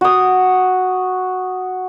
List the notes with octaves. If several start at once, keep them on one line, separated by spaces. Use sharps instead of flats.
F#4 D#6